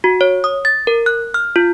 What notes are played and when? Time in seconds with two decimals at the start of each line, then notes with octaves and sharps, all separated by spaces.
0.04 F#4
0.21 C#5
0.44 D#6
0.65 A6
0.87 A#4
1.06 F#6
1.34 F6
1.56 F4